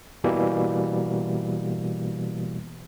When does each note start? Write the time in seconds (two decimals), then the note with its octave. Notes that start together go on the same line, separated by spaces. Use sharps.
0.24 B2 E3 G3 A#3